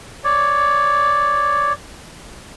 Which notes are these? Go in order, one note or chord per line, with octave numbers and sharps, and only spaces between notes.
C#5 D5